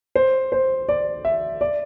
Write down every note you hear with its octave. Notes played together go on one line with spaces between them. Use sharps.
C5
C5
D5
E5
D5